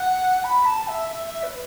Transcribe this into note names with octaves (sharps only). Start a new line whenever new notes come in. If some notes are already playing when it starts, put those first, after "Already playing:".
Already playing: F#5
B5
A5
E5
E5
E5
B4